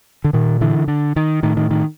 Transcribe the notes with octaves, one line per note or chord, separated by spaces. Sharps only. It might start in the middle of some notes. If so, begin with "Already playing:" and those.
D3
A#2 D#3
D3 E3
D3
D#3
A2 D#3
D#3
D#3